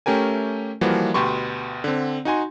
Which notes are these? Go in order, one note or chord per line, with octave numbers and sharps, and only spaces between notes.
A3 C#4 G4 A#4 G#5
E3 F3 G3 A#3 F#4
D2 B2 G4 B4 C6 C#6
D3 C4
D#4 F#4 G#5 C6